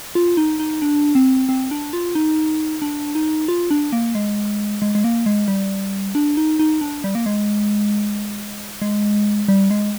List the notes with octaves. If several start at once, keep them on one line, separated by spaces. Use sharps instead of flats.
F4
D#4
D#4
D4
C4
C4
D4
F4
D#4
D4
D#4
F4
D4
A#3
G#3
G#3
G#3
A#3
G#3
G3
D4
D#4
D#4
D4
G3
A#3
G#3
G#3
G3
G#3